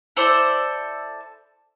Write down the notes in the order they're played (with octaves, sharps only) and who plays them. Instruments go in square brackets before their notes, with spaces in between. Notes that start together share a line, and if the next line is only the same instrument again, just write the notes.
[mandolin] E4 A4 C5 D5